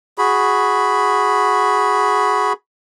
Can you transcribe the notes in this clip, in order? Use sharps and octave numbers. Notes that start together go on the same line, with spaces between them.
F#4 G#4 B5